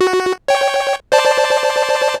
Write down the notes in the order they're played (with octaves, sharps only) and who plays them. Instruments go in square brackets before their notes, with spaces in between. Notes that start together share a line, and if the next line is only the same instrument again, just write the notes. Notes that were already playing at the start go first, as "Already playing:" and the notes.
[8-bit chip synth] F#4
C#5 G5
C5 D5 A5